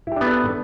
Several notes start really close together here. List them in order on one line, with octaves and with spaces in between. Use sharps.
E4 G4 D4 B3 A4